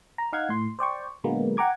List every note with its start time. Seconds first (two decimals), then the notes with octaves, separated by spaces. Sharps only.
0.18 A#5
0.33 D#4 F5 F#5 G#6
0.49 A2 C6
0.79 C5 D5 G5 C#6
1.24 A#2 D3 F#3 G#3 A#3 B3
1.57 F#5 G5 A#5 D6 G#6